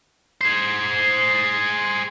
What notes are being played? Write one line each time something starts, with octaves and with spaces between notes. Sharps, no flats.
G#4 C5